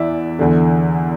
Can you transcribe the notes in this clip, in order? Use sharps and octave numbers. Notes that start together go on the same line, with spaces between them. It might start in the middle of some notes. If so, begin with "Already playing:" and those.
Already playing: E2 E3 D5 E5
E2 D3